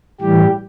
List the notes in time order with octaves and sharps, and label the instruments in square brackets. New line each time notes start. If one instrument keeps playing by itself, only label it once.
[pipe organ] A2 E3 G3 G4